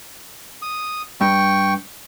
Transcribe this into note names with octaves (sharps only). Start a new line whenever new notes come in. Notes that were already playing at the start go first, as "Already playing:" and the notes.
D#6
G2 G5 C#6